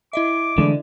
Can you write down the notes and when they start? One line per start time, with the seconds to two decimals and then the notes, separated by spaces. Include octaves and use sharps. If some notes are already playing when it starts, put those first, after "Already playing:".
0.13 E4 D#5 E5 D6
0.58 D3 E3 G#3 A3